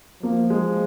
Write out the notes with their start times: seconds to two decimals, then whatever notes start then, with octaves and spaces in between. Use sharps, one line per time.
0.22 F3 A#3
0.50 G#3